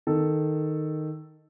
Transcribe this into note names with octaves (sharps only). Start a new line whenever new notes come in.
D#3 A4